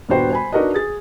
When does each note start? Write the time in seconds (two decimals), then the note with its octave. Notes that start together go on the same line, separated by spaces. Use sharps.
0.08 D#1 G2 B3 F#4 C5 G5
0.30 C5 G#5 B5
0.52 D4 D#4 F#4 A#4 B4 D#5
0.74 G#4 A6